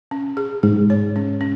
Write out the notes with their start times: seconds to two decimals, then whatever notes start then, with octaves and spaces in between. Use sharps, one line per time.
0.11 C#4
0.37 G#4
0.63 G#2 G#4
0.90 C#5
1.16 C#4
1.41 C#4